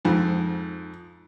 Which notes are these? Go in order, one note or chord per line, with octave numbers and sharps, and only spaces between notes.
F2 G#2